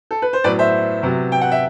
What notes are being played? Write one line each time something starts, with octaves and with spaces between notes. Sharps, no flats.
A4
B4
C5
A2 F#3 B3 B4 D5
C5 E5
C3 F#3 B3
G5
F#5
E5